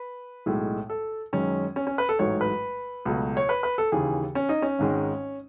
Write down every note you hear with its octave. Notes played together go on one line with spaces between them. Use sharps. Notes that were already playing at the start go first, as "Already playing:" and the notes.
Already playing: B4
B1 A2 G#3
A4
F#2 D#3 G#3 C#4
C#4
C#4
B4
A4
A1 G#2 F#3 A3 C#5
B4
C#2 B2 F#3 A3
C#5
B4
B4
A4
D#2 C#3 E3 G#4
C#4
D#4
C#4
G#1 G#2 D#3 G#3